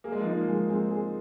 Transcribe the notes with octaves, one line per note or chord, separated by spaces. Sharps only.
A#3 G#4
G#3
F3
G#3 D#4
A#3
G#3
G#3 C4
G#4